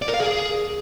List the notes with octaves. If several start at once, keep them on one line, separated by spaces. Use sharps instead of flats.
D5
A#4
F5
G#4